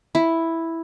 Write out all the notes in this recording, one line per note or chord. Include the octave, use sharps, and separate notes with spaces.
E4